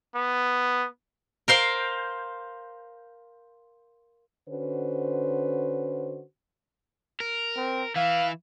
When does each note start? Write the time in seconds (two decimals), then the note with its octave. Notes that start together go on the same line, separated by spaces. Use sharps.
0.15 B3
1.48 A#4 C5 F5 G5
4.49 D3 C#4 F#4 B4 C5
7.20 A#4
7.57 C4
7.96 E3 E4 F5